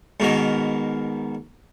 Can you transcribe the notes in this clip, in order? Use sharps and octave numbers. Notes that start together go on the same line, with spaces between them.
G#2 B2 D#3 A#4